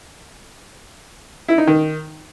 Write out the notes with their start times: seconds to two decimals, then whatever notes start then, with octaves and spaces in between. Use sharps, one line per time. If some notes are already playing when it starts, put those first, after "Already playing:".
1.48 E4
1.58 D#4
1.67 D#3